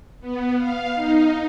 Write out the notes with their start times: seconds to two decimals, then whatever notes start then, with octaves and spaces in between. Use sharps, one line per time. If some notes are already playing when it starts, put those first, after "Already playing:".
0.20 B3
0.57 F5
0.95 D#4